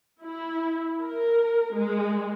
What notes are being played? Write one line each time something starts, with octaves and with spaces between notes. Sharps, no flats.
E4
A#4
G#3